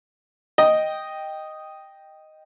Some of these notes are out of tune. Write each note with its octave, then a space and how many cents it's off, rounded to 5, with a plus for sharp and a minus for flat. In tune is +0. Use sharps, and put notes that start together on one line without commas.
D#5 +0 G5 +0